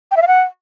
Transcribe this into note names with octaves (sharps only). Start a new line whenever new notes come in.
G5
E5
F5
F#5